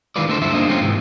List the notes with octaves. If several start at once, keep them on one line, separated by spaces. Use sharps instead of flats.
D#3 E3 G#3 F4 B4 D5
D3 A3 D#4 A4 C5
D2 G2 E4 C5 E5
A#3 D4 D#4 F4 C5 D#5
F#3 A3 C4 C#4 F4
G#2 C3 E3